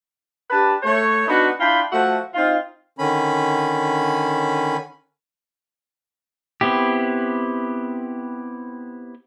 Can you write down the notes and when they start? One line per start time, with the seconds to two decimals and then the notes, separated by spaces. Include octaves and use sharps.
0.50 D4 G4 B4 A5
0.83 A3 C#5
1.28 B3 D4 D#4 F#4 B4
1.60 D4 E4 F4 G5 B5
1.92 F3 A3 F#4 E5 F#5
2.34 C4 D#4 F4
2.99 D3 D#3 C#4 B5
6.61 B3 C4 E4 G4